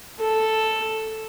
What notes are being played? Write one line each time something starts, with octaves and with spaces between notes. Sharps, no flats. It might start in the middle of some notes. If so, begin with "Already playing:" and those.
A4